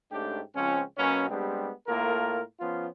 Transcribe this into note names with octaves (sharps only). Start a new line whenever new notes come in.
G#2 A3 C#4 D4 G4
C#2 F3 C4 C#4
B2 F#3 A#3 B3 C#4
G3 G#3 B3 C4 D4 G4
A2 A#3 F4 A4 A#4
F3 B3 C#4 F4